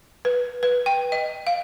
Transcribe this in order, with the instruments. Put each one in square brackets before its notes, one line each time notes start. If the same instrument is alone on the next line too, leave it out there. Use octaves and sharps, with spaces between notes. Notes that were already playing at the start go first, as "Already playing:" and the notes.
[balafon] B4
B4
G5
D#5
F5